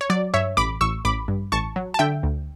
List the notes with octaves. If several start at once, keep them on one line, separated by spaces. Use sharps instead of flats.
C#5
F#3 D5
G2 C#5 E5
A1 B5 D6
A1 C#6 E6
A1 B5 D6
G2
A1 A5 C#6
F#3
A5
D3 E5 G5
D2